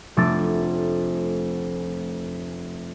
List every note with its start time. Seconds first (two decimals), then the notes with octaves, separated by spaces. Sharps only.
0.17 F1 A3 D4 A6